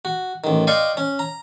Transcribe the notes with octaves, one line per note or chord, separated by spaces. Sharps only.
F#4
A1 D#3
D5 D#5 F5 G5 C6 C#6
C#4
A#5